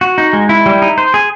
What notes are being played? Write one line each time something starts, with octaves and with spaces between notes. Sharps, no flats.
F#4
D#4
G#3
E4
G3
D#4
C5
G#4